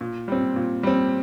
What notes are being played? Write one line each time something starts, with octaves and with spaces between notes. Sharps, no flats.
A#2
G3 C4
A#2
G3 C4